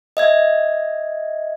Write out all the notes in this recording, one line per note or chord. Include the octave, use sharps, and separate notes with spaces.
D#5 E5 G#6